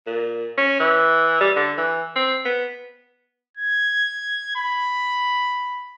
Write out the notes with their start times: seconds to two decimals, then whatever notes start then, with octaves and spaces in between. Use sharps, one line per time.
0.07 A#2
0.58 C#4
0.80 E3
1.41 G3
1.56 D3
1.78 E3
2.16 C4
2.45 B3
3.57 G#6
4.56 B5